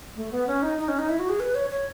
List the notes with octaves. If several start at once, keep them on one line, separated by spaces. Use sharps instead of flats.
A3
B3
C#4
D#4
D#4
C#4
D#4
E4
F#4
G#4
B4
C#5
C#5